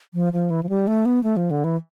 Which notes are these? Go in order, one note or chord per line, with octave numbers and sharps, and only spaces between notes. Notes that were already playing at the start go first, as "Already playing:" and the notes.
F3
F3
E3
F3
G3
A3
B3
A3
F3
D3
E3